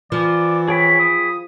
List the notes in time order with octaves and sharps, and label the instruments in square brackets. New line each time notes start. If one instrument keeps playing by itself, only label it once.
[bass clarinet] E3 [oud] F3 [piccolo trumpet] D5
[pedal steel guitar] G#4 G5 B5 [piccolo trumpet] C#5
[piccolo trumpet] D#6